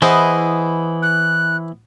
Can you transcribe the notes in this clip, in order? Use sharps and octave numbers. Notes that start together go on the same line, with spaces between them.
E3 B3 E4 G#4 C5 D#5
F#6